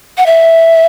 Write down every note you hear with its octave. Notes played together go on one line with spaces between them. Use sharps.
F#5
E5